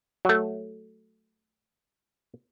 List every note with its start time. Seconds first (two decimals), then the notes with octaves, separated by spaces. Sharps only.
0.25 F#3 A3